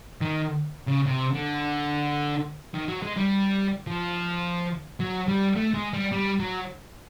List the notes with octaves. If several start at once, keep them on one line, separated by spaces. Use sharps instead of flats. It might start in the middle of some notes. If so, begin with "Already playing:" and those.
D#3
C#3
C3
D3
D#3
F#3
G#3
G3
F3
F#3
G3
A3
G#3
G3
G3
F#3